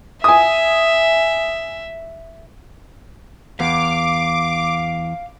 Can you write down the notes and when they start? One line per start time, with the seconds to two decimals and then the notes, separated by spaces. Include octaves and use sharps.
0.24 E5 G#5 D#6
3.59 E2 F5 D6